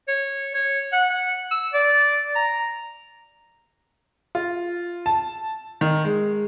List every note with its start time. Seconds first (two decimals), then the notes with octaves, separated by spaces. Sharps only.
0.08 C#5
0.54 C#5
0.92 F#5
1.10 F#5
1.51 E6
1.74 D5
2.36 A#5
4.35 F4
5.06 A5
5.81 D#3
6.04 G#3